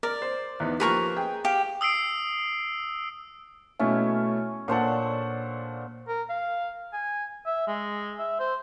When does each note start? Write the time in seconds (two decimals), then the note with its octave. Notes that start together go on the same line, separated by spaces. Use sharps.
0.03 A#4 D5
0.22 C5
0.60 E2 B3 D#4
0.80 F3 A#3 G4 B4 A#5 C#6
1.17 G#4 G5
1.45 G4 F5
1.81 D#6 E6 C7 D7
3.79 B2 A3 C#4 E4
4.68 A#2 D4 A4 C5 C#5 F#5
6.08 A#4
6.29 F5
6.93 G#5
7.46 E5
7.68 G#3
8.19 E5
8.40 C5